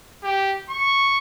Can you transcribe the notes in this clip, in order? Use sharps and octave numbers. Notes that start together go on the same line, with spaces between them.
G4
C#6